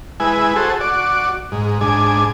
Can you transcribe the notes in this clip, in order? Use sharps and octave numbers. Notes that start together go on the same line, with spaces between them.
G#3 E4 B4 G#5
F#4 G#4 A4 C5
F#4 D5
G#2
G#2 D4 G#5